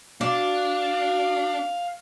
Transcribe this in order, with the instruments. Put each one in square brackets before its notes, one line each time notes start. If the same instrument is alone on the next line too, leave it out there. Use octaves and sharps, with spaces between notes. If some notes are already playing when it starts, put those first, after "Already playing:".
[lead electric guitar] D4 [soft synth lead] F#4 [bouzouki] D5 [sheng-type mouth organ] F5